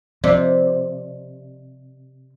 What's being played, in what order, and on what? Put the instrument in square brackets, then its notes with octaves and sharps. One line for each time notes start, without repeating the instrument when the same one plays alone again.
[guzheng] C3 [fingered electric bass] F3 C4 [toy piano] D5 D#5